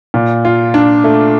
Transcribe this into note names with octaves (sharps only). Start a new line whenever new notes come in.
A#2
F4
D4
A3